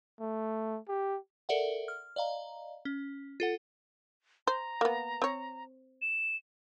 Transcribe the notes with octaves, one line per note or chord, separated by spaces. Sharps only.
A3
G4
A4 A#4 D5 E5 F#5
F6
D5 D#5 F5 A#5
C#4
F4 A4 F#5
C5 A#5
A#3 B3
C4 C#5
E7